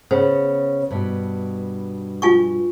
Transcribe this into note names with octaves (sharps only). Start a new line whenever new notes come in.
C#3 B3 C5
G2 B2
F4 G#5 C#6